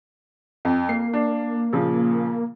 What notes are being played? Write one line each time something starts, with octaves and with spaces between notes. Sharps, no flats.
F2
A#3 C7
D4
A#2 C#3 F3